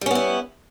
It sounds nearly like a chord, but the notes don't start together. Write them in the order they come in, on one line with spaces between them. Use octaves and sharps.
G3 C#4 B3 E4